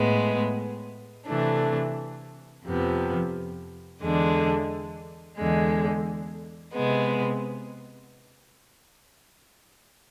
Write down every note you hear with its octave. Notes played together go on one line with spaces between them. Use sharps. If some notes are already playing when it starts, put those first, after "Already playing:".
Already playing: A2 G#3 B3
C3 E3 A3 D4
F2 C3 F3 B3
E2 D3 G#3 D4
E2 D3 G#3
C3 G#3 B3